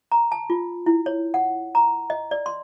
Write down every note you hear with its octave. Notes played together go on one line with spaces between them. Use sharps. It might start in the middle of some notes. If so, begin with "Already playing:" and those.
A#5
A5
F4
E4
C#5
F#5
A#5
D#5
D5
C6